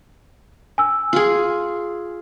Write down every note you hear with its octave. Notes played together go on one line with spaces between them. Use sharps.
G#5 E6
F4 G#4